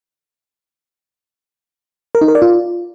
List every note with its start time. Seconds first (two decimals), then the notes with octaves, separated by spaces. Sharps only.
2.15 A#4
2.21 D#4
2.28 A#4
2.35 D5
2.42 F4